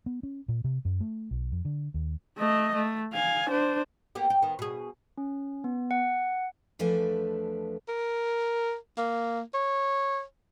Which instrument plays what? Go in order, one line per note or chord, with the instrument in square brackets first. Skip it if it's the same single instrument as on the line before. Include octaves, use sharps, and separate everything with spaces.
[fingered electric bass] B3
C#4
A#2
C3
F#2
A3
B1
F2
D3
D#2
[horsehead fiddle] A3 D#5
A3
F5 G#5
D4 C5
[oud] A#3 B3 G4
G4
D#3 B3
B2 G#4
[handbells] C#4
B3
F#5
[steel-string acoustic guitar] E2 F3 A3 D4 B4 G#5
[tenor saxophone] A#4
A#3
C#5